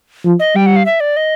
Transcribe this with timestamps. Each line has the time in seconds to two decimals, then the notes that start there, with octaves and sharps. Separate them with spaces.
0.25 F3
0.40 D#5
0.55 G3 G5
0.66 F#5
0.76 F5
0.86 E5
1.00 D5
1.17 D#5